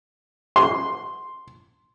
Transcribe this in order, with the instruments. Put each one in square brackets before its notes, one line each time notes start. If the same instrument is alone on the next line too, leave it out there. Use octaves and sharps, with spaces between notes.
[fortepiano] C6